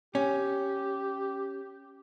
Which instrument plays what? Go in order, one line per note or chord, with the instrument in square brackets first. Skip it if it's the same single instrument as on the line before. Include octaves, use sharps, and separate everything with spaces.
[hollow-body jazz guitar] C#4 [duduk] G4